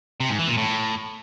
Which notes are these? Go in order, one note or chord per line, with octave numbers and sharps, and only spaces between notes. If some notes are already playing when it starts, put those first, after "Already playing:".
C3
G#2
E3
A#2
A2